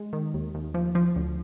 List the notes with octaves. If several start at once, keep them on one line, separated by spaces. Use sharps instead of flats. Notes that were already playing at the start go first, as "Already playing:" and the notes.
Already playing: G#3
D#3
D#2
D#2
F3
F3
D2